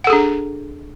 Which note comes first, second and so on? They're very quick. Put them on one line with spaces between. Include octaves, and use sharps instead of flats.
F#5 A4 G#4 D4